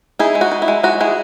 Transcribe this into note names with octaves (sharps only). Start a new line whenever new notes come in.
D#4 E4 G#4
G#3
F#4
D#4
E4
G#3
G#3 F#4
G#3 E4 G#4